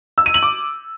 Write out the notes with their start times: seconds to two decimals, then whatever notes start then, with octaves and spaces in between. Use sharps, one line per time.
0.18 E6
0.26 D#7
0.34 F#7
0.43 D6